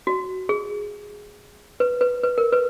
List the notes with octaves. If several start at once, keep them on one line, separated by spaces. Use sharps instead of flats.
F#4
G#4
B4
B4
B4
A#4
B4